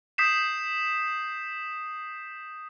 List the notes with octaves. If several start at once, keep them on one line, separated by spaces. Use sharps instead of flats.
D#6 G6 B6 C7 E7